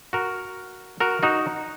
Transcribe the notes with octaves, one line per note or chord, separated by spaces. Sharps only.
F#4 A#4
F#4 A#4
D#4 F#4